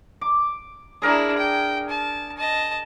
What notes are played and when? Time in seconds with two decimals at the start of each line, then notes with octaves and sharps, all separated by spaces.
0.21 D6
1.02 D4 E4 G#4 A#4 G#5
1.38 G5
1.89 A5
2.38 D#5 A5